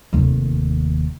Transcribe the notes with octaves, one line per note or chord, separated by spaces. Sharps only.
F1 D#2